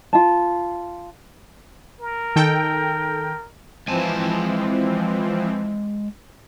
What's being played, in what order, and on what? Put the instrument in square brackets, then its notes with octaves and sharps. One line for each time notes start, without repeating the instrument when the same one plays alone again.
[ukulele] F4 A5
[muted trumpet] A#4
[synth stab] D#3 A4 G5
[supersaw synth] E3 F3 C4 [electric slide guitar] G#3 G#5 A5